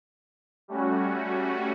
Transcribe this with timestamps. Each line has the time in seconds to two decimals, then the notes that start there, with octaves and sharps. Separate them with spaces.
0.68 G3 A3 C#4 F#4